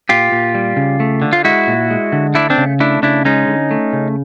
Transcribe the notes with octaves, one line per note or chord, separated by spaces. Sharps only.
A#2 F4 G4
A#2
G3
C#3
A3
D3
F4
G#3 E4 F#4
A#2
G#3
D3
A3 D4 E4
C4 D4
C#3
A3 D4 E4
C#3 D4 E4
G#3 C#4 D#4
D3
A3
C#3